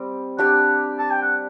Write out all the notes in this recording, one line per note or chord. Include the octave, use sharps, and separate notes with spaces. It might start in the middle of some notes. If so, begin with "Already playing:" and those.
Already playing: G3 C4
D4 G4 D5 F#5
A5
G5
F#5